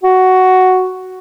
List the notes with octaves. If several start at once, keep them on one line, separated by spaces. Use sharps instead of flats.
F#4